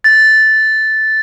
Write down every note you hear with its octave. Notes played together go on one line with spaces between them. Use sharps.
A6